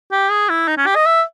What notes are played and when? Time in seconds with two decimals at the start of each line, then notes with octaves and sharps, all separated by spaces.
0.12 G4
0.30 G#4
0.49 E4
0.68 D#4
0.77 C#4
0.86 G4
0.95 D#5
1.05 E5